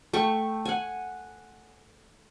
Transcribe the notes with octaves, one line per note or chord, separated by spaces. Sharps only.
A3 G5 C#6
F#5 G#5